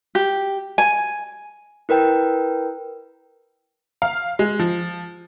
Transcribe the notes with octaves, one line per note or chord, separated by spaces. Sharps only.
G4
G#5
E4 A#4 B4 G5
F5
G#3
F3